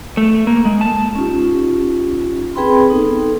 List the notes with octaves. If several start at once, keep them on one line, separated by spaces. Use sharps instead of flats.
A3
A#3
G#3
A5
C#4 D#4 F4 G4
C4 G#4 B4 G5 B5 C6
B3 D#4 A4